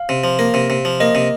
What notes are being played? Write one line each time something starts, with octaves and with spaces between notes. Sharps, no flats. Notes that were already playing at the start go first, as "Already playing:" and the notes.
Already playing: F5
C3
F3
A#3
C3
C3
F3
A#3 D#5
C3